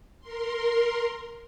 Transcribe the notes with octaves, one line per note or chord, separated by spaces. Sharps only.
A#4 C6